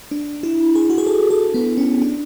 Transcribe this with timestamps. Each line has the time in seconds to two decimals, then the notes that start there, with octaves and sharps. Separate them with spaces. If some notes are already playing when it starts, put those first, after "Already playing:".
0.11 D4
0.43 E4
0.75 G#4
0.90 F#4
0.98 G#4
1.07 A4
1.30 A4
1.54 B3
1.78 C#4
2.01 D4